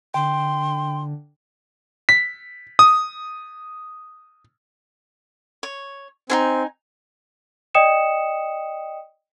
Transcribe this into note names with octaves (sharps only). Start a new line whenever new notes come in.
D3 G5 C6
B6
D#6
C#5
C4 D#4 F4 G#5
D5 D#5 G5 D#6 C#7 E7